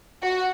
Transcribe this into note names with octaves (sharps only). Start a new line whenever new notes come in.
F#4